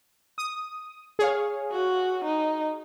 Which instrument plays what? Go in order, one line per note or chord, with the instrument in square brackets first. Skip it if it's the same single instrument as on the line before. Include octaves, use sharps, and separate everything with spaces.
[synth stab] D#6
G#4 C#5 F5
[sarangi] F#4
D#4